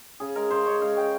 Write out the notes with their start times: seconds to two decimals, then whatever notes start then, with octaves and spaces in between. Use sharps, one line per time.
0.20 C#3 G#4
0.36 G#3 A#4
0.50 C#3 C5
0.66 G#3 C#5
0.82 G#3 F5
0.97 G#3 G5